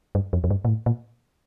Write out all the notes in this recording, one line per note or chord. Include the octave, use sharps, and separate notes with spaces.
G2
F2
F2
G2
A#2
A2
A#2